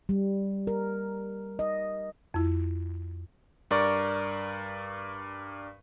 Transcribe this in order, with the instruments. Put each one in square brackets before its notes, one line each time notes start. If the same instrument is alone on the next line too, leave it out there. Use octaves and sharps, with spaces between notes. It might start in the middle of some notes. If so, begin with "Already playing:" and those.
[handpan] G3
A#4
D#5
[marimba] F2 E4
[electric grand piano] G2 A#4 D5 C#6